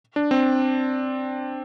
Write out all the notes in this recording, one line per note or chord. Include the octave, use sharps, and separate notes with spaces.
D4
C4